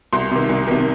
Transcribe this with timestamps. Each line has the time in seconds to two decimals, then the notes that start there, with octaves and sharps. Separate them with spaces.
0.13 C2 C6
0.31 C3 D#3
0.49 C2
0.67 C3 D#3